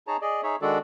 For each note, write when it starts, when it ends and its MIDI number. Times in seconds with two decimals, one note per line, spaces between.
0.07 0.17 63
0.07 0.17 68
0.07 0.17 73
0.07 0.17 81
0.07 0.17 82
0.22 0.41 68
0.22 0.41 74
0.22 0.41 75
0.43 0.56 63
0.43 0.56 68
0.43 0.56 73
0.43 0.56 76
0.62 0.78 51
0.62 0.78 56
0.62 0.78 62
0.62 0.78 66
0.62 0.78 69
0.62 0.78 74